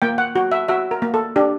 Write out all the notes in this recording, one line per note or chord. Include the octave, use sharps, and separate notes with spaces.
A#3 G5
F#5
F#4
E5
F#4 E5
A#4
A#3
A4
D4 G4